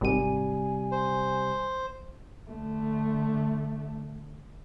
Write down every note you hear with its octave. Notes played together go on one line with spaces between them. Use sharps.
G#1 C3 G3 G4 G#5 D#7
C5
D3 A3